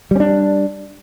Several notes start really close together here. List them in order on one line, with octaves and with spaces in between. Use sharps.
G3 C#4 D4